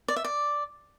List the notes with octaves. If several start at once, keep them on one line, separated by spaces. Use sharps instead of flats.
D5
E5
D5